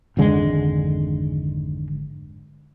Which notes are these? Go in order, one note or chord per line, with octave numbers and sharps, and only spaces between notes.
G#1 F2 D3 G#3